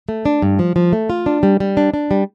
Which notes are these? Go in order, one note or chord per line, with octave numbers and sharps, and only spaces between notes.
A3
D4
G2
F3
F3
A3
F4
D4
G3
G3
D4
D4
G3